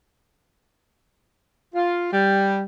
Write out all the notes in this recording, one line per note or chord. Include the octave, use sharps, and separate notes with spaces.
F4
G3